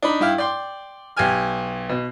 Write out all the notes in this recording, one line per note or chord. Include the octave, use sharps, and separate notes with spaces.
D4 D#4 B5
G2 E4 F5 G5
D5 G5 C6
B1 G4 G5 G#5 F6
B2